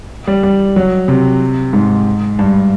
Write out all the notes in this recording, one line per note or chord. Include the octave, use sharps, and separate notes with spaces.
G3
G3
F#3
C3
G#2
G2